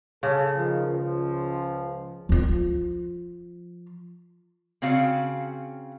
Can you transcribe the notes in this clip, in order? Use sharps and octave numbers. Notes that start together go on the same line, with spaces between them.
C#3 A4
D#3 F3
C#2 F3
F3 F4
C#3 C4 C#4 F#4 F5